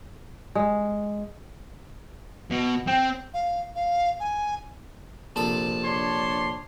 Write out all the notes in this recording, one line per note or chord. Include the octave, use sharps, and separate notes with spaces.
G#3
B2
C4 G5
F5
F5
G#5
A#1 C3 A4 A5
D4 C#5 C6